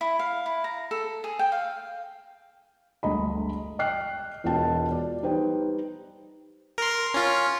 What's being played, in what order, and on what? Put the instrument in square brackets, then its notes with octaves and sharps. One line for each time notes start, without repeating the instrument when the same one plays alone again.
[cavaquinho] E4
F5
E4
A#5
A4
G#4
G5
F5
[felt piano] G1 D2 G#3 D#5 A#5 B5
D#5 G5 F6 F#6 C7
E1 B2 F4 G5 A5
D5
G3 D#4 B4 C5 G5
[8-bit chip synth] A#4 C6
C#4 F4